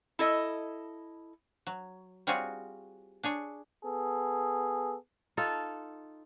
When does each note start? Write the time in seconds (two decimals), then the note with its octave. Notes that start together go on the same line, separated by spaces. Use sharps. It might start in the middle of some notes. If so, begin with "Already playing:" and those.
0.19 E4 A4 D#5
1.67 F#3
2.27 G3 C4 F4 F#4 G#4 C#5
3.23 D4 G#4 C#5
3.84 B3 G#4 A4
5.37 D#4 F4 A4